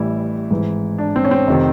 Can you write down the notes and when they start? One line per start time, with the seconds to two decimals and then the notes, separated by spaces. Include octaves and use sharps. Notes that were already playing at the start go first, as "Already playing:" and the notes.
Already playing: A1 A2 E3 G3 E4
0.51 G#1 G#2 E3
0.98 D4
1.16 C4
1.24 C#4
1.31 C4
1.47 F1 C3 D#3